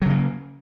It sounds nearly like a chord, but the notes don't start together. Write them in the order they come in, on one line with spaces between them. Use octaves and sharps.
F#3 C#3 A#3